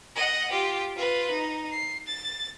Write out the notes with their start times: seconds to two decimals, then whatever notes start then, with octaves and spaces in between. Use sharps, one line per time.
0.16 D#5 F#5
0.50 F4 G4
0.96 F4 B4
1.31 D#4
1.71 C7
2.06 A6